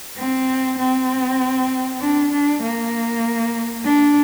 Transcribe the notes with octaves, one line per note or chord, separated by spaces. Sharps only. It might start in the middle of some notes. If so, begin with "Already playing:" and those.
C4
C4
D4
D4
A#3
D4